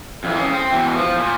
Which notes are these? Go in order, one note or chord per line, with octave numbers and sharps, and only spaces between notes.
F2 E3
C#3
C4
B2 E3
F3
A#2